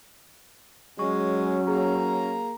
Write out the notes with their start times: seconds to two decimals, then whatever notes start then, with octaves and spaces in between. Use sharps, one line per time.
0.99 F#3 G#3 C#4 C#6
1.68 A#3 G#4 A#5